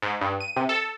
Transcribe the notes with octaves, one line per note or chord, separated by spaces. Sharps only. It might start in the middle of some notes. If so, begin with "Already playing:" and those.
G#2
G2
D#7
C3
A4